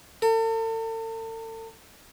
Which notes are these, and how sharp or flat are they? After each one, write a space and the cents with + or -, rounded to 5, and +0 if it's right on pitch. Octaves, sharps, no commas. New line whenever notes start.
A4 +40